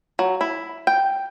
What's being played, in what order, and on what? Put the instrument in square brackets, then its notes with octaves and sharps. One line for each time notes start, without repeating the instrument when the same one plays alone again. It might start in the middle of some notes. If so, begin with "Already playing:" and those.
[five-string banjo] F#3
E4
G5